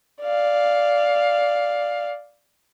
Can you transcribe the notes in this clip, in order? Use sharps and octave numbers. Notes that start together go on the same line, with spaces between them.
D5 F5